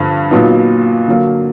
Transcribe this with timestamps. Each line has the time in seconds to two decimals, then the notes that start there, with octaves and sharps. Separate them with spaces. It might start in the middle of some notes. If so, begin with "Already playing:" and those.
Already playing: G2 D3 F3
0.31 A#2 F#3 B3 D#4
1.08 D3 F#3 A#3